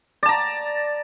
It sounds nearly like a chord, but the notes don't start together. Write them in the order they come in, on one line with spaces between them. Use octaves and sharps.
D5 A5 A#5